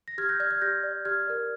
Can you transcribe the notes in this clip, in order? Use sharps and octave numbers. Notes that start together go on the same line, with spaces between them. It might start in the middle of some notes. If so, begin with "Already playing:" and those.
A#6
G4 F6 G#6
G6 A#6
D5 F6 G#6
F6 G#6
G4 G6 A#6
D5
G4 F6 G#6
A#4 D5